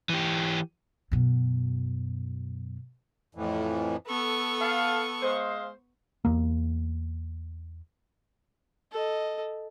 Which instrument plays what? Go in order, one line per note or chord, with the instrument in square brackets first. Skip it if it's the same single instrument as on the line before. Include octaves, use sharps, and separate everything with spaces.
[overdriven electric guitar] E3 G4
[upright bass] F#2 B2
[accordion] F2 A2 E3
[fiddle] B3 C#6 [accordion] A4
[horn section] F5 A5
G#3 C5 F5
[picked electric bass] E2 A#3
[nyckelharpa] A4 D#5